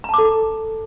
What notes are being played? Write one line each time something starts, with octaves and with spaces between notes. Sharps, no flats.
A4 A5 A#5 D6